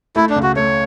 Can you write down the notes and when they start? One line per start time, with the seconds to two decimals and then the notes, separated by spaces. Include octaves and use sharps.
0.16 A3 E4
0.30 D4
0.36 C#2
0.43 F#4
0.56 A3 C#5